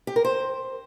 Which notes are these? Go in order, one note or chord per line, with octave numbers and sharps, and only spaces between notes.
G4
A#4
C5